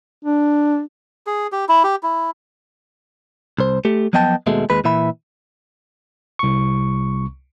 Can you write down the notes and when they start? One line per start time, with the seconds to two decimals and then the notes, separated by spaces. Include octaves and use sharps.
0.25 D4
1.26 G#4
1.52 G4
1.69 E4
1.84 G4
2.03 E4
3.59 C2 C5
3.85 A3 G4
4.13 F3 F#3 B3 D#5 G5 A5
4.46 D#2 B2 G#3 A3
4.70 D#2 G#3 B4
4.84 A#2 E3 E5 B5
6.39 C2 C#6